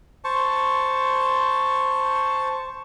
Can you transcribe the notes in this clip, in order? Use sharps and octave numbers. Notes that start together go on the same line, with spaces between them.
C5 A5 C#6